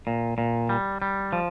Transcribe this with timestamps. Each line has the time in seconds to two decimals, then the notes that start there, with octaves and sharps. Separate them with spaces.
0.07 A#2
0.38 A#2
0.69 G3
1.02 G3
1.33 F3